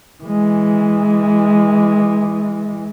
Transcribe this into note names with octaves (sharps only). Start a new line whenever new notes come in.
E3 G#3